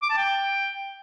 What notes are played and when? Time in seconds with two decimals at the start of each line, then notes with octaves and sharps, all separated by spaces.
0.03 D6
0.10 A5
0.17 G5